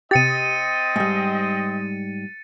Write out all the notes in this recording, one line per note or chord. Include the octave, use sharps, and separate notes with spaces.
C3 C4 G4 D#5 A6 C#7 D#7
G#2 G3